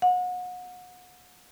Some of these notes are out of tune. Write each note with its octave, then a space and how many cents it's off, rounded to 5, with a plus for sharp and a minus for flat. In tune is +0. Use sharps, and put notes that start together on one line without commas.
F#5 -35